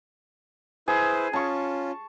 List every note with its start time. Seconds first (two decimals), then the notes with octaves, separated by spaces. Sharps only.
0.88 E4 G#4 B4 C5
1.33 C#4 F4 A5 C#6